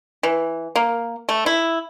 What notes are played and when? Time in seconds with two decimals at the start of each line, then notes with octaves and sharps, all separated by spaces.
0.23 E3
0.76 A#3
1.29 A3
1.46 E4